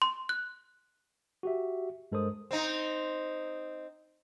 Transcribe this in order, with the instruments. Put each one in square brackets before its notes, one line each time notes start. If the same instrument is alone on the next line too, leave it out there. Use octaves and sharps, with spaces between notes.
[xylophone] C6
F#6
[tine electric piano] F#4 G4 E5
G2 G#3 A4 A#4 C5 D#6
[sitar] C4 D#4